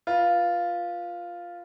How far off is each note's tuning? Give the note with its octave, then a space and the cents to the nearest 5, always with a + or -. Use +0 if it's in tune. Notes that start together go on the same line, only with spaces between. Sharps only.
F4 +0 B4 -25